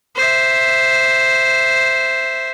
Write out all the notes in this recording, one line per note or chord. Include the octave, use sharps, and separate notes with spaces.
C5 E5